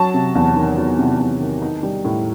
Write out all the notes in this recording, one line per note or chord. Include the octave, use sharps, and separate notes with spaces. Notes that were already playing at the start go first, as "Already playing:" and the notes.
Already playing: F#3 A5
C3
E2
D#3
F#3
C3
E2
D#3
D#4
G3
A2